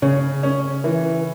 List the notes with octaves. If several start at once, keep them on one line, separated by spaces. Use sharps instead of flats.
C#3 C#4
C#4
E3